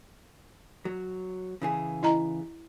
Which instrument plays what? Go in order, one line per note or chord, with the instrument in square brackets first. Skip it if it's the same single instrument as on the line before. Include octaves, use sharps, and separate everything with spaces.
[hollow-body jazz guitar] F#3
C#3 E3 G#4
[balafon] E4 D#5 A#5